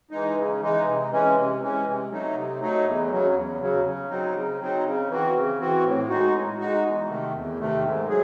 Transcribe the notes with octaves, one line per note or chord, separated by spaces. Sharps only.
E3 G#3 D#4
C#3
E3 G#3 D#4
C3
E3 G#3 C#4
C3
E3 G#3 C#4
C3
F#3 A3 D#4
C3
F#3 A3 D#4
E2
C#3 F#3
E2
C#3 F#3
C#3
F#3 C4 D#4
C#3
F#3 C4 D#4
C#3
E3 C4 F#4
C#3
E3 C4 F#4
A2
G#3 D#4 F#4
A2
G#3 D#4 F#4
E2
C3 D#3 A3
E2
C3 D#3 A3
G#2
F#3 G#4